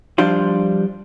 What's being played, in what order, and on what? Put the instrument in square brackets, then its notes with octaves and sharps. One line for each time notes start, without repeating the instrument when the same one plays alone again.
[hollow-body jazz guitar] F3 G3 D4 F4